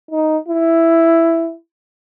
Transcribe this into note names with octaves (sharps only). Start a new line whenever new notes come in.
D#4
E4